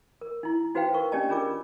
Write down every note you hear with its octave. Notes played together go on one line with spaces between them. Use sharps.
A#4
D#4 E4
D#4 F#4 B4 C5 F5 G5
A#4 C#6
C#4 D4 G4 D5 D#5 A5
C#4 D4 F4 G#4 A#4 D6